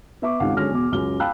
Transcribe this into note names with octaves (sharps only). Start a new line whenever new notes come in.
B3 E5 C#6 D6
G#1 C#2 D#3 F5 F#5
D3 F#3 G#3 C#4 F6 A#6
E2 B2 D6
C#2 F#2 F6 G7
F5 G5 A5 B5 E6 F#6